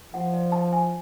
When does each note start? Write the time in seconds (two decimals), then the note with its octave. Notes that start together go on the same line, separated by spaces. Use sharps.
0.14 F3 F#5
0.34 D5
0.52 A5
0.73 G#5